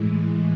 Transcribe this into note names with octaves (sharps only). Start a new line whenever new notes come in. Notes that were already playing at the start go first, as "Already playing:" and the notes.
Already playing: A2 E3 G#3